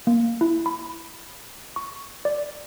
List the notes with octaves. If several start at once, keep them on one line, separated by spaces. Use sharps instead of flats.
A#3
E4
B5
C#6
D5